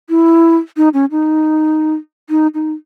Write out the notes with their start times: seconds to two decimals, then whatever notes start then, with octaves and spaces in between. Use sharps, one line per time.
0.10 E4
0.77 D#4
0.94 C#4
1.11 D#4
2.30 D#4
2.54 D#4